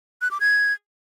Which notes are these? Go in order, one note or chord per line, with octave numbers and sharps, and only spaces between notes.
F#6
D6
G#6